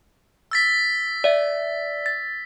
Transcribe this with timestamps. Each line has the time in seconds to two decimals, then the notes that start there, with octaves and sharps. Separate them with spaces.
0.51 E6 A6 B6
1.24 D5 E5
2.06 A6